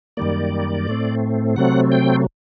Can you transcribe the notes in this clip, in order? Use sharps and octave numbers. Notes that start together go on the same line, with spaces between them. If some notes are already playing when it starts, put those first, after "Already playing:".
F#2 D#3 G3 A#3 D5
A2 A3 C4
C3 F#3 A3 C4 F#5
G5